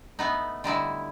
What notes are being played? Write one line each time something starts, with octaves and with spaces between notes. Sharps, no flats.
A3 B3 D#4
D3 G3 D#4 E4